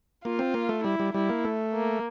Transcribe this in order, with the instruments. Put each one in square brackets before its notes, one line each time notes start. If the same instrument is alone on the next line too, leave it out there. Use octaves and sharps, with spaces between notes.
[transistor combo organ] A#3 [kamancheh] F4
[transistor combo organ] C4
A#3
A3
[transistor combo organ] G3 [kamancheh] E4
[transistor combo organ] G3
[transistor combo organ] G3 [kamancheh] E4
[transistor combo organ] A#3
A3
[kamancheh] A#3